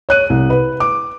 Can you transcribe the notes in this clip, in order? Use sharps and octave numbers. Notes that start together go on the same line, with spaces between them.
C#5 F#6 D#7
C2
B4
D6